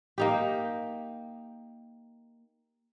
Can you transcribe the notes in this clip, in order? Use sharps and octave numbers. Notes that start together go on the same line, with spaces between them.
A#3 D#4 G4